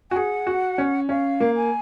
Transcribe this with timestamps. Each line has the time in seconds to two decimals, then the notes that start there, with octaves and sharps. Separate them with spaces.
0.10 F#4 G#5
0.16 G#4 F#5
0.47 F#4
0.78 C#4
1.09 C#4 F5
1.40 A#3
1.55 G#5